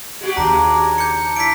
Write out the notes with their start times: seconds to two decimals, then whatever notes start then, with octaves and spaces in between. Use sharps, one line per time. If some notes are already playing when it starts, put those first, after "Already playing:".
0.21 G#3 F#4 G4
0.37 D#2 C#3 D4 A#5
0.98 G6 C#7
1.36 D4 E4 B6 D7